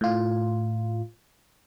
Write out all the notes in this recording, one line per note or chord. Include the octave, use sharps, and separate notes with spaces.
A2 F4